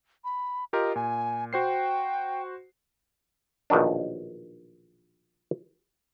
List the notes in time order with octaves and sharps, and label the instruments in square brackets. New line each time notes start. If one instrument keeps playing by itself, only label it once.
[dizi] B5
[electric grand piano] F4 G4 A#4 [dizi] D#5
[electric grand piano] A#2 [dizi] G#5
[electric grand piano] F#4 C5 C7 [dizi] G5
[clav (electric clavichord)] A#1 B2 D#3 F#3 D4